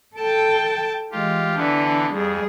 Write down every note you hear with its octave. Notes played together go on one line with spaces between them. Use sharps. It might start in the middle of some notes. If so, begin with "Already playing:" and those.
A4 G5 A5
E3 G#3 F4 G4
D3 E3 B3 D4
F2 G3 G#4